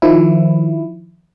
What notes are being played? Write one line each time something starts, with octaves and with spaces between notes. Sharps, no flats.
D#3 F3 E4